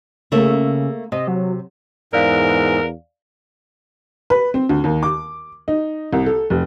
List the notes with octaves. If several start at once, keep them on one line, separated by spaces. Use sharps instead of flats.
C#3 A3 A#3 E5
C3 D#5
F#3
E2 G#2 A#4 D5 F5
B4
C4
D2
D#2
D6
D#4
C2
A4
F1